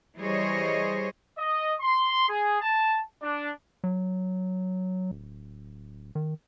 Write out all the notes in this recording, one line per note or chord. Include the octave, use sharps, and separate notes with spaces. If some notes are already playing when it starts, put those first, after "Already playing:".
E3 G3 G#4 C5 C#5 D#5
D#5
C6
G#4
A5
D4
F#3
D1
D#3